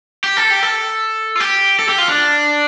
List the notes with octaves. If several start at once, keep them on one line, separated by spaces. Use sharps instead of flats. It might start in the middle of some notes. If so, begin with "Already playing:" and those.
G4
A4
G4
A4
F4
G4
A4
G4
F4
D4